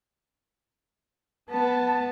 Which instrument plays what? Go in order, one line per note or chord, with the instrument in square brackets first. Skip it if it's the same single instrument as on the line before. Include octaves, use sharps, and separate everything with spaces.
[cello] B3 [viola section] A5